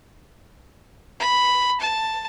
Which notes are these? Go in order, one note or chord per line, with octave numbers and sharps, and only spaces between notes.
B5
A5